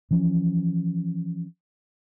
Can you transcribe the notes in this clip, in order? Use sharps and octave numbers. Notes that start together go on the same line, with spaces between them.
E3 F3 C#4